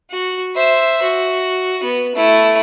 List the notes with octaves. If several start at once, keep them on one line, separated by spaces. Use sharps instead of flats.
F#4
C5 E5
F#4
B3
A3 E4